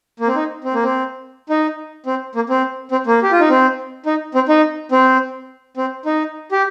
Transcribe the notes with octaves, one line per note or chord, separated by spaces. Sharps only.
A#3
C4
D#4
C4
A#3
C4
D#4
C4
A#3
C4
C4
A#3
G4
F4
D#4
C4
D#4
C4
D#4
C4
C4
D#4
G4